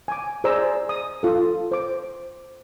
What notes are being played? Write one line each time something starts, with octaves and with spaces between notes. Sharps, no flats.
G#5 D6
G#4 C5 D5 A#5 E6
D#6
F4 A4
C5 D6